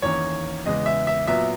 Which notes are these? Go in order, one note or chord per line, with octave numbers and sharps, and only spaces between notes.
E2 D#3 A#3 C#4 C#5
E2 C#3 G#3 B3 D#5
E5
E5
A#2 F#3 B3 E5